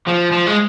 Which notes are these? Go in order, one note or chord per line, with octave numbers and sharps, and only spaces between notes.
F3
F3
G#3